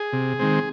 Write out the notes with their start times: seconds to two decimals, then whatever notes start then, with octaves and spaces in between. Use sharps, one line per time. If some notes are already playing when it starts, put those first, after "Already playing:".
Already playing: G#4
0.13 C3
0.39 D#3 G#3 C4